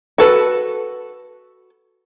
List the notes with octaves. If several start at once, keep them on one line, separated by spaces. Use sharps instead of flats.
F#4 A4 B4